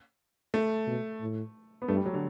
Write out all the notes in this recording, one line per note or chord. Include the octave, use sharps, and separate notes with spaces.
A3
B2
A2
B3
G2 A3
G3
F#3
D3